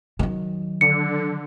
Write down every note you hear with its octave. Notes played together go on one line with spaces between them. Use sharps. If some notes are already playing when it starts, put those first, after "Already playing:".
D#3 F#3
D3 C#7